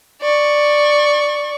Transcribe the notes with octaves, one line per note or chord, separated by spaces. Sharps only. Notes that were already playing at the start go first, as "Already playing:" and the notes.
D5 C#6